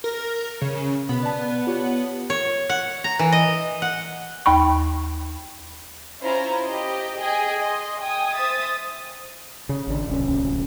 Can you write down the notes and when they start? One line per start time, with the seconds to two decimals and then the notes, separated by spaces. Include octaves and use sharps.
0.04 A#4
0.61 C#3
1.09 B2 B3
1.23 D5 A5
1.67 F4 G4 C#5
2.30 C#5
2.69 F#5
3.04 A#5
3.19 E3
3.32 D#5
3.82 F#5
4.46 D#2 G5 B5 C#6
6.20 C#4 E4 F4 C5 A#5
6.64 G4 D#5
7.18 G#4 D#5 G5 G#5
7.60 D#5 C6
8.00 G5 G#5 D#6
8.34 C5 E5 D#6 A6
9.69 C#3
9.87 G#1 D4
10.07 D1 C2 C#4